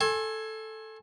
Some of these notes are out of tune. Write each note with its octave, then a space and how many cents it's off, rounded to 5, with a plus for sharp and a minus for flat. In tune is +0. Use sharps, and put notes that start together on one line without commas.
A4 +0 G#5 +0 C6 +45